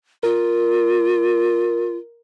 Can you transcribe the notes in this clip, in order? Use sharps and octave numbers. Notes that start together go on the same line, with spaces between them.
F4 A#4